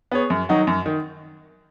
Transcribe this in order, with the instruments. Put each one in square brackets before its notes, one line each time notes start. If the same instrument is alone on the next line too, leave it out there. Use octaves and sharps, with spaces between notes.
[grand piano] B3 G#4 C#5
F#2
D#3 F#3 D#4 F#4
F#2
D#3